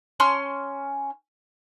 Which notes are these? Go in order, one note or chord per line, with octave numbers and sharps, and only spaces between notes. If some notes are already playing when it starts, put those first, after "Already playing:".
C#4 C6 F6